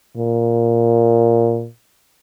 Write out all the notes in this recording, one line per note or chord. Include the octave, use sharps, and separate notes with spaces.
A#2